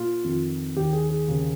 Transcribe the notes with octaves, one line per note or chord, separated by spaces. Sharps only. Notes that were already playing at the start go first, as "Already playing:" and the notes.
Already playing: A#2 F4
F2 D#3
D#2 D#3 G4
G#4
G#4
D#2 C#3